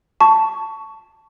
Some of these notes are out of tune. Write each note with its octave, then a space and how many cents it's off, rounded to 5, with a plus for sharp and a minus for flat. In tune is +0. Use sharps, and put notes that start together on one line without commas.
A5 +5 C#6 +15